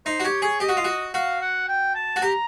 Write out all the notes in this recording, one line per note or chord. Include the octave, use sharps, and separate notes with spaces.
D#4 C5
F#4
G4 C#5
G#4 C#5
G4 D#5
F#4
F4
F#4
F#4 F5
F#5
G5
A5
F#4
G4 A#5